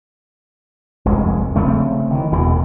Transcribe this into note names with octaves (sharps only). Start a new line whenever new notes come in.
F1 C2 F2 G#3
C#3 A3 C4
D#3 E3
E1 E2 B2 E3